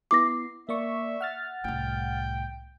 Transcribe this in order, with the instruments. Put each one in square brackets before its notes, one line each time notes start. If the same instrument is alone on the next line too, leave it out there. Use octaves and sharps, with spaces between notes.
[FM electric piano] B3 E4 C7 [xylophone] D6 A#6
[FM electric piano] A#3 D5 C#6 [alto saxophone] E5
[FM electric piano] F#5 F6 A6
[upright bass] C2 A2 [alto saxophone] G5